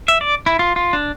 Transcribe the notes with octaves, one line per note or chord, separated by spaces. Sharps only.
E5
D5
E4
F4
F4
D4